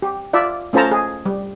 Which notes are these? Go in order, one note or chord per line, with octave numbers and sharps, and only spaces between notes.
G4
F4 D5 E5
A3 C#4 F4 C5 A5 A#5
G#4
G3